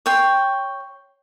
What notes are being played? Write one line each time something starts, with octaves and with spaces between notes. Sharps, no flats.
C#5 G5 C6